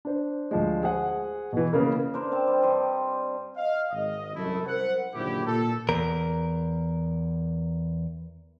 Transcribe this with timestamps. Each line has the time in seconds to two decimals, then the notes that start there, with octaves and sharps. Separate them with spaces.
0.05 D4 C5
0.51 D2 F3 G#3
0.83 G#4 C5 F#5 G#5
1.53 B2 E3
1.73 C#3 A#3 B3 A#4
2.14 D4 A#4 C5
2.32 C4 A5
2.47 G3
2.63 G2 G4 C5 D#5
3.56 D#5 F5
3.91 G#1 D#5
4.35 C2 F#2 A3 E4
4.66 A#4 C5 F#5
5.13 F#1 D#2 A#2 D3 E4 G4
5.45 A#2 A4
5.89 E2 A#4